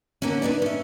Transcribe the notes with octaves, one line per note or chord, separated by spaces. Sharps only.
D#2 A#2 D3 A#3 B3 C#4
D4 D#4 B4 D5
C#4 E5